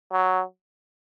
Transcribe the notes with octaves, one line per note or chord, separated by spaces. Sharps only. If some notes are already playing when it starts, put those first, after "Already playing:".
F#3